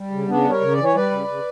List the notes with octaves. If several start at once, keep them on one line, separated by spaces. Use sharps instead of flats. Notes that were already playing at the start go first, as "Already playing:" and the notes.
Already playing: G3
C#3
C#3 B3 D4
G3
A#4 C#5
C#3
D5
E3
C#5
G3 B4 D5
C#3
C#3